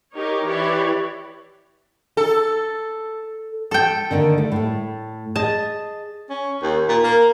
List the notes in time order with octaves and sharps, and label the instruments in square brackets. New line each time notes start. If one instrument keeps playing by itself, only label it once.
[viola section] D#4 G4 A#4 C#5
E3 G4 C#5 D5 B5
[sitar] A4
[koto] A4 G5
[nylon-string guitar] D3 D#3 A#3
A3
A2 A3
[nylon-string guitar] G#4 D#5 [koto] A5
[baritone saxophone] C#4
D#2
A#2
A#3